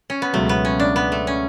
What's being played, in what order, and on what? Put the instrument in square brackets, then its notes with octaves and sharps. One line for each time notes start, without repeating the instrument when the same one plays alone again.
[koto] C#4
B3
[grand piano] C#2 B2 F#3 [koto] A3
[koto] B3
C#4
D4
B3
A3
C#4